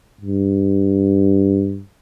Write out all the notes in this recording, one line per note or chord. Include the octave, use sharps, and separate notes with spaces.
G2